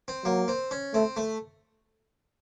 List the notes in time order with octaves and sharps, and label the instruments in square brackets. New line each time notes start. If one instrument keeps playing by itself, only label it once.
[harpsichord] C4
[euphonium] F#3 [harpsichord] A#3
[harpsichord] C4
C#4
[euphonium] A3 [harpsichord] C4
[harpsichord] A3